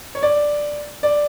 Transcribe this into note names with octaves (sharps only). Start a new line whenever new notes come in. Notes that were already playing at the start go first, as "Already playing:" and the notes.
C#5
D5
D5